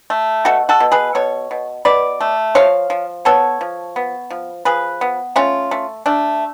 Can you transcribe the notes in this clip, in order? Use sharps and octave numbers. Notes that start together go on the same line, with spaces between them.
A3
B2 F#4 A4
F#4 A4
B2
G#4 B4
B2 A4 C#5
B2
B2 B4 D5
A3
F3 C#5 F5
F3
B3 A4 C#5
F3
B3
F3
F3 G#4 B4
B3
A3 C#4 F4
A3
A3 D4